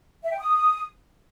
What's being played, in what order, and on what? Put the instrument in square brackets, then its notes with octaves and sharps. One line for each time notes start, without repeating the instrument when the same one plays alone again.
[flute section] E5
G5
D#6